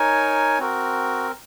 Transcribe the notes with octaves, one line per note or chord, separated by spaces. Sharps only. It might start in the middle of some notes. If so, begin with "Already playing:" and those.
Already playing: D#4 A#4 C#5 G#5
C4 F#4 A#4